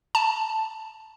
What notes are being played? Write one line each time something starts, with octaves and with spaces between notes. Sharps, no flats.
A5